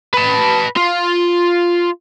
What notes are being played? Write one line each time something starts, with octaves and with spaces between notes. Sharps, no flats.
B4 A5
F4